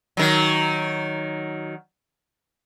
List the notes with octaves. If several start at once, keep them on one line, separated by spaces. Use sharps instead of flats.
D#3 F#3